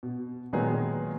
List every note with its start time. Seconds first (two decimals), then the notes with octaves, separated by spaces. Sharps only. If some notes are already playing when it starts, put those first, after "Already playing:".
0.03 B2
0.53 A#2 D#3 F#3 G#3 B3 G#4